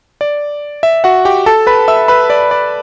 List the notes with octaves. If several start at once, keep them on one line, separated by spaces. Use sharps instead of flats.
D5
E5
F#4 F#5
G4 G5
A4 A5
B4 B5
E5 E6
B4 B5
D5
D5